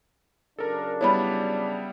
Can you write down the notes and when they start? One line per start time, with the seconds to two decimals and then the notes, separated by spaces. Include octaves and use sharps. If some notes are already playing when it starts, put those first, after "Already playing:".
0.59 C#3 F#3 D4 A4 A#4
1.01 G3 B3 E4 C#5 B5